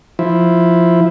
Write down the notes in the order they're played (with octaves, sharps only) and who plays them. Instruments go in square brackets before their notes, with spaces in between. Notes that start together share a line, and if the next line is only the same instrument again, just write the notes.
[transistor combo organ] F3 E4